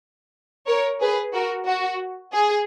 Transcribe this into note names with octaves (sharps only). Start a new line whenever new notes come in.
A#4 C#5
G#4 B4
F#4 A#4
F#4
G#4